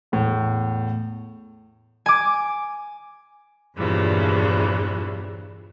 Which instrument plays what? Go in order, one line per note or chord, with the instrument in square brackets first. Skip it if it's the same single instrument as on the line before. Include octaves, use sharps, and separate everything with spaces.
[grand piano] E2 A2
[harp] G#5 D6
[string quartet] E2 G2 A#2 C#3 E3 F3